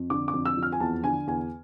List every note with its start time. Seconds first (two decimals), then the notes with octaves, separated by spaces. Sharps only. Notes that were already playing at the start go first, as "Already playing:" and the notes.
Already playing: F2
0.10 D3 D6
0.28 D6
0.33 F2
0.45 E6
0.57 F3
0.63 F6
0.72 G#5
0.80 E2 A5
1.04 D3 G#5
1.27 E2 G#5